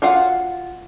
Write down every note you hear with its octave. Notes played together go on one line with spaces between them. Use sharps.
F4 F#4 F5 F#5